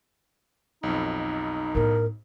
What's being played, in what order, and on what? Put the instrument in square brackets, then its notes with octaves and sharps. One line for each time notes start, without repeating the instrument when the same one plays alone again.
[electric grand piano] B1 F2 [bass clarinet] D#4
[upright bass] A2 B3 [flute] A#4